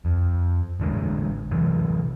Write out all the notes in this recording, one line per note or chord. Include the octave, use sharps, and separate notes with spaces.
F2
A1 D3 D#3 G#3
C3 E3 F#3